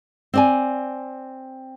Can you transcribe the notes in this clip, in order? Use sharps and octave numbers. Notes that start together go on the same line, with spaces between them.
C4 D5 G#5